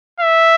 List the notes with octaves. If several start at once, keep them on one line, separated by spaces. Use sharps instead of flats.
E5